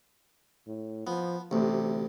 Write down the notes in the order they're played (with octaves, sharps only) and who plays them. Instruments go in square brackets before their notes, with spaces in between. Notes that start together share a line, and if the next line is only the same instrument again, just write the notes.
[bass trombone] A2
[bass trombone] F3 [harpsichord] B3
[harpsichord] A1 D2 [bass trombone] C3